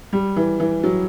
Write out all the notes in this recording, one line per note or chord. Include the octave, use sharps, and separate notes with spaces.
G3
E3
E3
F#3